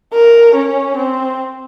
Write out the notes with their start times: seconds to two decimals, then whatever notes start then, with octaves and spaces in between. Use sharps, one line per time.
0.13 A#4
0.55 C#4
0.97 C4